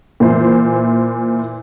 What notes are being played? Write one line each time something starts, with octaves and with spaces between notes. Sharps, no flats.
A#2 E3 C5